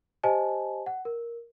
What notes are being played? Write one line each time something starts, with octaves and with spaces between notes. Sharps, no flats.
G4 C5 D#5 G#5 A5
F#5
A#4